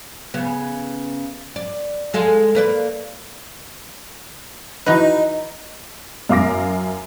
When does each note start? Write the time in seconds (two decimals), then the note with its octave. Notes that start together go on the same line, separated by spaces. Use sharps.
0.34 C#3 B3
1.56 D5
2.14 G#3 A4 F5
2.55 A#3 B4 D5
4.86 E3 D#4 F#4 B4
6.29 F#2 F5 D6 A#6